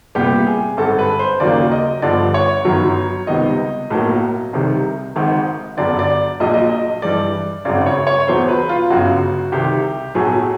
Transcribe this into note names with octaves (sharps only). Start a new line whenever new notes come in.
C2 A#2 G3 B3 G4
G#4
G#1 G2 D3 A4
B4
C5
D#2 C#3 F#3 A#3 D5
D#5
G1 G2 D3 F3 D5
C#5
G1 F#2 D#3 F#3
C#2 C3 D#3 G3 B3 D#5
B1 A2 F#3 A#3
C2 C3 D#3 G3
G#1 G#2 D#3
G1 F#2 D3 D5
D5
A#1 A#2 F#3 D#5
D#5
D#5
G2 E3 G3 D5
G#1 F#2 C#3 D5
C#5
C#5
E1 E2 B2 F#3 C5
B4
F4
G1 F#2 C#3 F#4
C2 C3 D#3 G4
B1 A2 F#3 A3 G#4